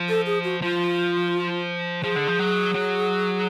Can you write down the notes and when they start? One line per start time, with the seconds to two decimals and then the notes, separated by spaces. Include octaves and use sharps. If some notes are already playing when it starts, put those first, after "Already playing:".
Already playing: F3
0.09 A4
0.26 G#4
0.44 F#4
0.62 F3 F4
2.03 F3 G#4
2.15 D3
2.28 F3
2.39 F#3
2.74 F#3